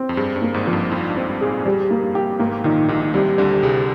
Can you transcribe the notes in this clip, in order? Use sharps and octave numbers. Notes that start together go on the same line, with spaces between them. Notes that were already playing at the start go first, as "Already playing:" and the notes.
Already playing: C4
F2
G2 G#4
G2
A#3
G#1 G#2
F3
G2
F2 F4
G2
C4
G2
A#2 G#4
G#1 G#2
F2 G3
A#3
G2
G4
G#1 G#2 A#3
A#1 A#2 D#3
A#1 A#2 D#3
C2 C3 G3
D2 D3 G3
C2 C3 G#4